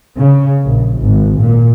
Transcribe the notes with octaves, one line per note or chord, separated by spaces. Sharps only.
C#3
A#1
G#1
A#2